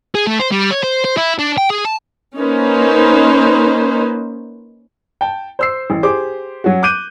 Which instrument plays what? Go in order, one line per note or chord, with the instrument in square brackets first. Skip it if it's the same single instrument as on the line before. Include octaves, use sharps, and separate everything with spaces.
[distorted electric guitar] G#4
A3
C5
G3
C#5
C5
C5
E4
D4
G5
G#4
A5
[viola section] A#3 C#4 D#4 B4 C5
[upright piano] G5 A5
C5 E6 C7
A1
G4 G#4 C5 D6
F#3 C#4 F#4
D6 F#6 G6 D#7